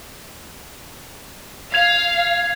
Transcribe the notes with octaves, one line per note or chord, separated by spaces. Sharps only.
F5 G#6 F7